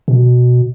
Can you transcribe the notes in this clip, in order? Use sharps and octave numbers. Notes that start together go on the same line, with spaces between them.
B2